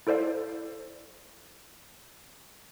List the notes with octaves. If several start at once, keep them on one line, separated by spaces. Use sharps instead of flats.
E4 A4 C5 D5 F5